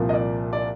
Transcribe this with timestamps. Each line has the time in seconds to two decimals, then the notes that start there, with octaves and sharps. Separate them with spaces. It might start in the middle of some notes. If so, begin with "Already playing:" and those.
Already playing: C2 A#2 F3
0.09 D#5
0.13 D5
0.53 D5